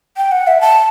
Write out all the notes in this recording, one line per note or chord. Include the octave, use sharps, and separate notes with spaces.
G5
F#5
E5
A5